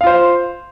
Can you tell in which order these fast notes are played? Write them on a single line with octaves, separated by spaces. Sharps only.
F5 F4 C5